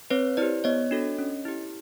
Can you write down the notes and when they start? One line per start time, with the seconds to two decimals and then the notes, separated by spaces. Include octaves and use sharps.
0.10 C4 B4 C#5
0.37 E4 G4 C5 D5
0.64 B3 C#5 D#5
0.91 D4 F#4 A4
1.18 C#4
1.45 E4 G4